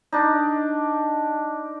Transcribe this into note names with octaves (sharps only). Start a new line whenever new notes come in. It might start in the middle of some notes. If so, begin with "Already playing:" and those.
D4 D#4